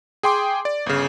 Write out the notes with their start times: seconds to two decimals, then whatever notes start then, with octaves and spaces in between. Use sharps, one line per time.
0.23 G#4 G5 C6 D6
0.65 D5
0.86 G1 C#3